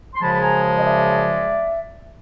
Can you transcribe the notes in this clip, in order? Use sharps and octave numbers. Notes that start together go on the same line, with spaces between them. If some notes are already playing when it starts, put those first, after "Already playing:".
C6
F#2 C#3 F3 G#3 A5 B5
B5
G#5 A#5
D#5
D5 E5